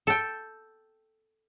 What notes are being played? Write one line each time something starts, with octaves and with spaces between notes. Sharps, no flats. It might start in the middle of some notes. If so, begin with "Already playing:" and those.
A4 G5